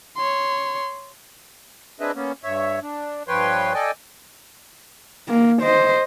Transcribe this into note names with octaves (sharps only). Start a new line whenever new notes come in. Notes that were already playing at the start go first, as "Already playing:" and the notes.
C#5 C6
C4 D4 G#4 B4 D#5 E5
A#3 B3 C#4
G2 C#5 E5
D4
G2 F3 B4 C#5 G5 C6
A4 D5 D#5 G5 G#5
A#3
C5 D#5